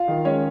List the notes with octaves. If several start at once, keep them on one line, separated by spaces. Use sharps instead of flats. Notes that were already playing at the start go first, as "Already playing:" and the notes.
Already playing: F4 F5
D#3
G#3 C#4 C#5